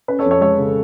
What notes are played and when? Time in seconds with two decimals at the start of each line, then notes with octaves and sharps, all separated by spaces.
0.08 C#4 B4
0.19 A4 C#5
0.25 F2
0.31 A4 C#5
0.41 G#3 A4 C#5
0.58 C#3